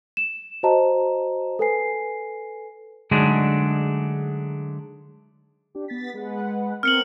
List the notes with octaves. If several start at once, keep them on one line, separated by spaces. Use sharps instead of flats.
E7
F#4 C5 D#5 A5 A#5
A4 B4 G#5 C7
D3 F#3 G#3 A3 D4 D#4
D4 G4
B3 A6 B6
G#3 B4 F#5
B3 C4 A#4 F6 C#7 F#7